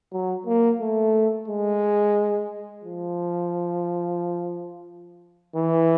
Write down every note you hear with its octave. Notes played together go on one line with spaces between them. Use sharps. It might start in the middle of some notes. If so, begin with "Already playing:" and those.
F#3
A#3
A3
G#3
F3
E3